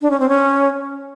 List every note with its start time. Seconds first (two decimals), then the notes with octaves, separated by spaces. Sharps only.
0.02 D4
0.11 C#4
0.20 C4
0.29 C#4